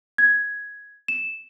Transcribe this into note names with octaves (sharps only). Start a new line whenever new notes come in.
G#6
E7